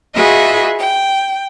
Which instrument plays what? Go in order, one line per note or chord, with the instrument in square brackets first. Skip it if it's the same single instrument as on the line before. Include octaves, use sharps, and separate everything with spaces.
[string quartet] F4 F#4 G#4 B4 D#5 E5
G5